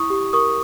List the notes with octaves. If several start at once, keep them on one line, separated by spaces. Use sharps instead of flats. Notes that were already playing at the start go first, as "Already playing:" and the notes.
Already playing: E4 C#6 D#6
G4
A#4 C#6 D#6